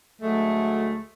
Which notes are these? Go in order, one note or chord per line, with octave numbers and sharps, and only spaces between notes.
D2 F#3 G#3 A3